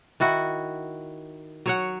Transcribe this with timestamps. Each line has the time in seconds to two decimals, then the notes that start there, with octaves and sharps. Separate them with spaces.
0.20 D#3 E4 F#4
1.66 F#3 C#5 F#5